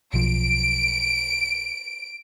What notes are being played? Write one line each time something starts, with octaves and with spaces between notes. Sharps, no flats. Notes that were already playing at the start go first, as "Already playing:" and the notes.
B1 F3 D7